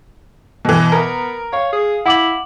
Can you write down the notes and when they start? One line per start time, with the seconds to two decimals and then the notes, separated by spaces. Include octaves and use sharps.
0.65 B2 E3
0.92 B3 A#4
1.53 C#5 F5
1.73 G#4
2.06 E4 F#5 D6 F#7